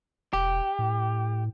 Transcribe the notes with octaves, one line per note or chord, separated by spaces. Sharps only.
E1 G4
A2